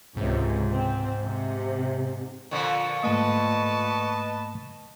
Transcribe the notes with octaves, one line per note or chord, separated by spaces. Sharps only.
C#2 G#2 C3
C4
C3
A#2 D3 F3 C#6
G#2 A3 A#3 B4 D#5 A5